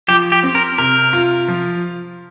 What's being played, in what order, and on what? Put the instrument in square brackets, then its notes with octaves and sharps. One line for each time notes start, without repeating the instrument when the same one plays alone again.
[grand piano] F3 [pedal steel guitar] G4
[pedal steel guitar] G4
[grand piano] C4
[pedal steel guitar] A#4
[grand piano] C3 [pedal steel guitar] A#4
[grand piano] F4
F3